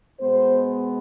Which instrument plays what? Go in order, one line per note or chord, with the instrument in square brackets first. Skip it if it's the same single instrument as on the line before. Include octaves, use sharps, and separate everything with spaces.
[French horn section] B2 G#3 B3 C5